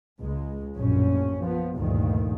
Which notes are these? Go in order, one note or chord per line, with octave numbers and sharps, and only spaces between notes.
C#2 G#3
A#1 F#2 A2 C#4
F3 B3
D2 G2 A#2 D#3 F3